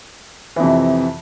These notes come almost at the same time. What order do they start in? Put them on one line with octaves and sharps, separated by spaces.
E3 F2 C3